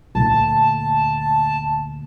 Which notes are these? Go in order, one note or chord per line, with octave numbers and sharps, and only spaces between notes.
D2 A#2 A5